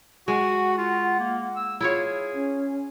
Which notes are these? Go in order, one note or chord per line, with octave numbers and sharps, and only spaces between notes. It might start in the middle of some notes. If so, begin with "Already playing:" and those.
G#3 F#4 F#5
F4
A#3
E6
E4 F4 G#4 C#5
C#4